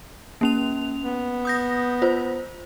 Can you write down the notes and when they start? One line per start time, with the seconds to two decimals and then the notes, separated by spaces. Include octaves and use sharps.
0.41 A#3 C#4 F7
1.04 B3
1.45 D#6 G6 A#6
2.02 F4 C5